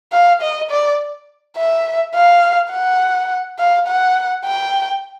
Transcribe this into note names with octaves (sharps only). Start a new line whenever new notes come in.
F5
D#5
D5
E5
F5
F#5
F5
F#5
G5